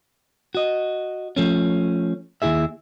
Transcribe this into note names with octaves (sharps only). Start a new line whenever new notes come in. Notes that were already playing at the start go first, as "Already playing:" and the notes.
F#4 D#5
F3 A3 C#4
D#2 C#3 E4 G#4 E5